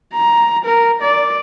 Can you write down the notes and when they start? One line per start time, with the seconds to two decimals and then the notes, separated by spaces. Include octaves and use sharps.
0.14 A#5
0.65 A#4
1.02 D5